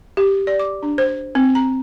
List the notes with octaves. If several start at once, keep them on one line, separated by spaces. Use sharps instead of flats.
G4
D5
D6
D4
C5
C4
A#5